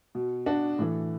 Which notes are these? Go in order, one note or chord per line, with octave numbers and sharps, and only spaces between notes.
B2
D4 F#4
A2 E3